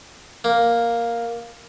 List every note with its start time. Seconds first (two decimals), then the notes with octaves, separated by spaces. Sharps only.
0.44 A#3